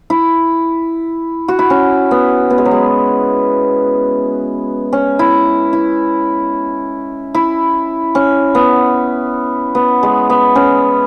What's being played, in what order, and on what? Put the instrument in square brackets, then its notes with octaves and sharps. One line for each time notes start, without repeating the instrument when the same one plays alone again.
[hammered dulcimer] E4
F#4
E4
C#4
B3
B3
G#3
F#3
G#3
C#4
E4
E4
E4
C#4
B3
B3
G#3
B3
C#4